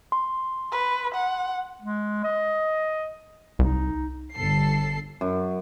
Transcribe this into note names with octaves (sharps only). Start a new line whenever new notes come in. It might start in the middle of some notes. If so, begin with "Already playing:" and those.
C6
B4
F#5
G#3
D#5
C2 D#4
G1 A4 C7
F#2